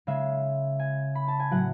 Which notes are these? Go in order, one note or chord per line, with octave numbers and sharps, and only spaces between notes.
C#3 G#3 E5
G#5
B5
A5
G#5
A2 F#3 F#5